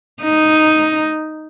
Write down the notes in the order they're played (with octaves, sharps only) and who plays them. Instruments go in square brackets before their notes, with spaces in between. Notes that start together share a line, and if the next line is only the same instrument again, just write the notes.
[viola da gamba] D#4